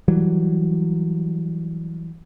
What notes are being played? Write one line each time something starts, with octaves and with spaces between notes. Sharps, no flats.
E3 F#3 G3